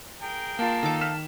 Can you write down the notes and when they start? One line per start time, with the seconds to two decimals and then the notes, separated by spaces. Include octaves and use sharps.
0.22 G#4 A#4 G5
0.59 A#3 F4 F5 A5
0.83 D#3 D#4 A4 D6
1.01 F6 B6 E7